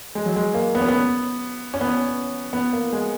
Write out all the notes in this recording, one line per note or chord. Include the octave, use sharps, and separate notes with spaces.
G#3
F#3
G#3
A#3
B3
C#4
B3
C#4
B3
C#4
B3
A#3
G#3